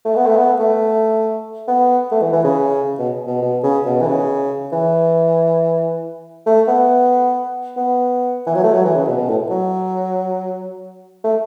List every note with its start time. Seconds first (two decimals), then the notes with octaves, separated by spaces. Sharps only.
0.05 A3
0.16 B3
0.27 A3
0.38 B3
0.59 A3
1.68 B3
2.12 A3
2.22 E3
2.33 E3
2.44 C#3
2.99 B2
3.27 B2
3.42 B2
3.63 C#3
3.86 B2
4.01 E3
4.07 C#3
4.72 E3
6.46 A3
6.68 B3
7.77 B3
8.46 E3
8.55 F#3
8.64 A3
8.74 F#3
8.85 E3
8.96 C#3
9.07 B2
9.18 B2
9.29 A2
9.50 F#3
11.24 A3